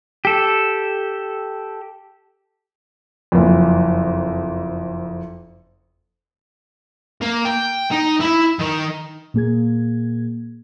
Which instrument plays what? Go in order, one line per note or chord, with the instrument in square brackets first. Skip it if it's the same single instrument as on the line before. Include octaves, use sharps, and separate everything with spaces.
[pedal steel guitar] G4 A4
[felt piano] F#1 F2
[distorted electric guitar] A#3
G5
D#4
E4 E5
D#3
[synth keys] A#2 A#3 G#4 G#6